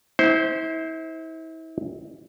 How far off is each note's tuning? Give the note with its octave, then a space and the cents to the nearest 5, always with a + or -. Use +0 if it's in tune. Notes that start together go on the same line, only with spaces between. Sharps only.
E4 -35 C5 +0